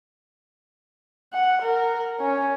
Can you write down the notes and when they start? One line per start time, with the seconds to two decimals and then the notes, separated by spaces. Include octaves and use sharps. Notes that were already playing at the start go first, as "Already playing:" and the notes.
1.33 F#5
1.62 A#4
2.20 C#4